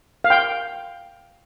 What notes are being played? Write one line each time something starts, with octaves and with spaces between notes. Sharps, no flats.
F5
G5